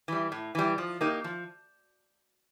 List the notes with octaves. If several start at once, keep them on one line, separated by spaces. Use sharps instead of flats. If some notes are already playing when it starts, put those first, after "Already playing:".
E3 G3
A2
E3 G3
F3
A#3 D#4 G4
F3